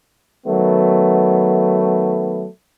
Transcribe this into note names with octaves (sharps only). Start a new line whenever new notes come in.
D#3 F#3 A3 B3